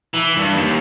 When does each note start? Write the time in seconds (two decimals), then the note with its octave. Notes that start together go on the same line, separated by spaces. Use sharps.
0.14 E3
0.37 G2
0.55 D#2